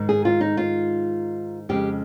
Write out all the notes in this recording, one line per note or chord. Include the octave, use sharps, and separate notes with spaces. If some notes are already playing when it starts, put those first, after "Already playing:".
Already playing: G#2 D#3 G#3
G#4
F4
D#4
F4
F2 C#3 G#3 G4